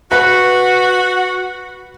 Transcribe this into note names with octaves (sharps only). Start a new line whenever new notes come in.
F#4 B4